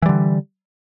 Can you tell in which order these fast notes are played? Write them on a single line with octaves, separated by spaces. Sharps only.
E3 G3 D3